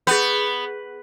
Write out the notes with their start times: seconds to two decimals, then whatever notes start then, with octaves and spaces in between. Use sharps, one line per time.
0.07 B3 G#4 G6